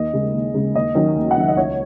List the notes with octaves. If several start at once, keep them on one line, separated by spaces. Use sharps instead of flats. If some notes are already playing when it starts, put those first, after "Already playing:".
Already playing: D#2 D#5
C#3 G#3
D#2
C#3 G#3
D#2 D#5
D#3 F#3 C#4
D#2
F#5
D#3 F#3 C#4 E5
D#5
C#2 C#5